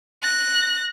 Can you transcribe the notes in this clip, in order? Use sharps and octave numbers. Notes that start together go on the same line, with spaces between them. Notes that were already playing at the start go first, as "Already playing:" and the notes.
F#6 A#6